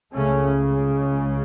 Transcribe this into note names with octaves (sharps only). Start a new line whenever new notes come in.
C#2 C#3 A3 C#4